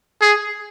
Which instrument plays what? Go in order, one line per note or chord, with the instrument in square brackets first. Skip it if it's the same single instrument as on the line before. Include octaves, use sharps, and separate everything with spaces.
[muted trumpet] G#4